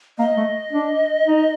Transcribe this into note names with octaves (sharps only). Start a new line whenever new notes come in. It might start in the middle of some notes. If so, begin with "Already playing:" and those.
A#3 D#5
A3
D4
D#4